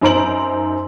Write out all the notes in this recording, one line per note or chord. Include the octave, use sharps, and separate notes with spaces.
F#2 D#4 C5 A#5 D7 F#7